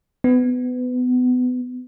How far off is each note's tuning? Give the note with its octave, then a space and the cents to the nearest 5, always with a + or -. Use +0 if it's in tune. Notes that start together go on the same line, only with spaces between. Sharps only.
B3 +25